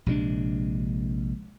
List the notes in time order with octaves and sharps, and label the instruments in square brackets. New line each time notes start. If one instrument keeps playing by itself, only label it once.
[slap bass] A#1 C3 G#3 D4